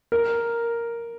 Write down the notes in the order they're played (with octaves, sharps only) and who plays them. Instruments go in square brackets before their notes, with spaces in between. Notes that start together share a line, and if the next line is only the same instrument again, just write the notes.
[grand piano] A#4